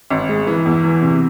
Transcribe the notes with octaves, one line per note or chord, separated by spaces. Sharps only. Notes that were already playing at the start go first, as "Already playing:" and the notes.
G#1
G#3
E3
E2
E3
C3